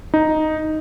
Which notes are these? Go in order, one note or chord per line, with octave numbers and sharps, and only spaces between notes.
D#4